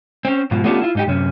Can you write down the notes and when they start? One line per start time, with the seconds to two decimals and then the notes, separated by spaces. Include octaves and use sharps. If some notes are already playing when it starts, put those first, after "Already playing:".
0.25 C4 C#4
0.51 G#2 B2 F3
0.64 A3 B3 C#4 D4 F4 G4
0.82 E4 F4
0.95 G#2 D#4 G4
1.07 F#2 C3 C#4